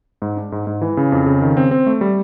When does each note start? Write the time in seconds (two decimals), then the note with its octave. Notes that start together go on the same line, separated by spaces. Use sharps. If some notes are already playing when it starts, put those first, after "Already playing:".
0.22 G#2
0.37 D4
0.52 G#2
0.67 G#2
0.82 E3
0.97 C#3
1.12 F2
1.26 C#3
1.41 D#3
1.57 C4
1.71 C4
1.87 A3
2.01 G3